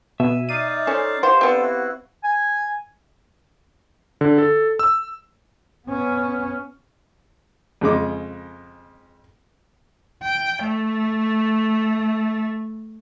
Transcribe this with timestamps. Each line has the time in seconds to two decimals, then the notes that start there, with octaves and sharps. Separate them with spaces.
0.20 B2 E5 G#5
0.49 D#4 D5 F5 D#7
0.87 C#4 A4 C5
1.23 G4 C5 F5 F#5
1.41 B3 C4 D4 A4 C5
1.62 E4 F#4
2.24 G#5
4.21 D3
4.38 A4
4.79 E6
5.87 B3 C#4
7.81 F2 C#3 G#3 D6
10.23 G5
10.64 A3